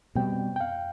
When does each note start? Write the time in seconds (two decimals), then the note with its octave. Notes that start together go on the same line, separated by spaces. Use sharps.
0.15 B2 G3 C4 G5
0.56 G5
0.60 F5